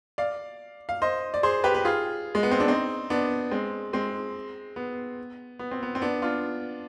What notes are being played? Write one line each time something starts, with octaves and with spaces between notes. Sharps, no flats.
D5 F5
F5
C5 D#5
D5
G#4 C5
G4 B4
B4
F4 G#4
G#3
B3
C4
D4
C4 D#4
B3 D4
G#3 C4
G#3 C4
B3
B3
C4
B3
C4
B3 D4
D4 F4